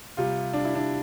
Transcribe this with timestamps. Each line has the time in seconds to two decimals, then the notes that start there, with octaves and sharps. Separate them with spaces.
0.17 C3 G3 F4
0.53 D4
0.65 E4
0.75 D4